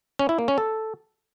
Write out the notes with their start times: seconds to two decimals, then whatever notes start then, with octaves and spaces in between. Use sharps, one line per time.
0.19 C#4
0.29 E4
0.39 A#3
0.48 C#4
0.58 A4